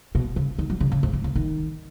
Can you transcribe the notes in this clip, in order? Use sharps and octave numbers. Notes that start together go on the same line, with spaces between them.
B2
C#3
D#3
F#3
C#3
C#3
G#2
G#2
C#3
D#3